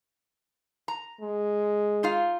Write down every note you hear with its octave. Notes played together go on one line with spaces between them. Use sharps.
A#5
G#3
D#4 F4 F5